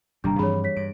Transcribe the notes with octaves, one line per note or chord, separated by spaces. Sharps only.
G1 C3 D#3 G3 A#3 D4 A#5
G2 E3 F3 C4 D4 G#4 C#5 B5
C#5 B6
G2 D7